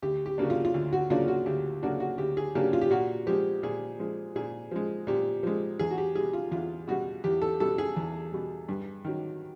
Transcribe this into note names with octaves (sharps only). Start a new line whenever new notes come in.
D2 G4
G4
C#3 F#3 A#3 D4
F4
F4
D2
F#4
C#3 F#3 A#3 D4 F4
F#4
D2 G4
C#3 F#3 A#3 D4 F#4
F#4
D2 G4
G#4
C#3 F#3 A#3 D4 G4
F4
G4
A#2 F#4
F3 G#3 G4
A#2 G#4
F3 G#3
A#2 G#4
F3 G#3
A#2 G4
F3 G#3
E2 G#4
F#4
G4
B2 G3 G#4
F4
E2 F4
B2 G3 F#4
E2 G4
A4
B2 G3 A4
G#4
E2
B2 G3
G2
D#3 F#3